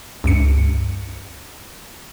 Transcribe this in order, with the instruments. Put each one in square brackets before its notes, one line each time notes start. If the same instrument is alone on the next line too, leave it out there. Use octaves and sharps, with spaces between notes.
[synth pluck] C#2 G2 C#7